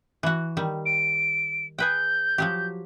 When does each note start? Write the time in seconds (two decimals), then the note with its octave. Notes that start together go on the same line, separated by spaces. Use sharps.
0.23 E3 F#4
0.57 D#3 G3
0.86 D7
1.79 G#4 B4 G5 G6
2.38 F3 F#3 G4